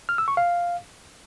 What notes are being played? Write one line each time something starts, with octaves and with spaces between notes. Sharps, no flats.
F6
E6
C#6
F5